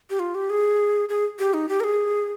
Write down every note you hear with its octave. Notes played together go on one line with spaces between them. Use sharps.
G4
F4
G4
G#4
G#4
G4
D#4
G4
A#4
G#4